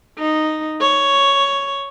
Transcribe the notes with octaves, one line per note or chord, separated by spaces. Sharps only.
D#4
C#5